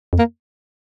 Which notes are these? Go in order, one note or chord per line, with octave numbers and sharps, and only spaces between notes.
F2
A#3